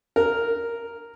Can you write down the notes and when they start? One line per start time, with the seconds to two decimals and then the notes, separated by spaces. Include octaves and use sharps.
0.16 A#4